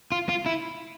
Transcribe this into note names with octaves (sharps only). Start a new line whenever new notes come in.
F4
F4
E4